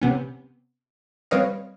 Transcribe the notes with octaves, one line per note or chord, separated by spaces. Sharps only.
C3 B3 C#4
G3 C4 B4 C#5 D#5 F5